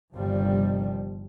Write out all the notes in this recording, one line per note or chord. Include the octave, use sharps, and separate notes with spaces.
G1 G2 C3 D#3 F3 G3